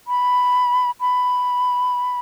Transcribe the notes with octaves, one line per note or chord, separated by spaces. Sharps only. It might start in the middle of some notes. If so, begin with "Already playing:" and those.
B5
B5